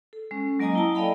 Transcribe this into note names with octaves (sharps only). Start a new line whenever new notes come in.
A4
G#3 C#4
F#3 A#3 D#5 G#5 A#5 D#6
E4 A5
A4 D5 D#5 F5 G5 B5